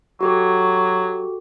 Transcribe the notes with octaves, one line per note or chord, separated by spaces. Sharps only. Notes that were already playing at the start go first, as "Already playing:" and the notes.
F#3 F#4 G4 A4